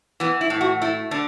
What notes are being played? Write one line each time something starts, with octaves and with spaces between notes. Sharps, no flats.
E3 B3
E4
A2
F#4
A3 E4
D3 D4